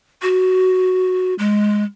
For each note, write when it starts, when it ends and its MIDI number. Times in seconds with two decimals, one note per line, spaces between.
0.22 1.34 66
1.39 1.84 56